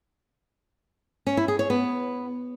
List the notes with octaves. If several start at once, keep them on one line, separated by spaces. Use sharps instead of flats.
C#4
E4
G#4
C#5
B3